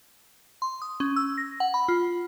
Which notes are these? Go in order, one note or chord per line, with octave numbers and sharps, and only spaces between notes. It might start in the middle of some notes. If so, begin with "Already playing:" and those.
C6
D#6
C#4
E6
A#6
F#5
B5
F4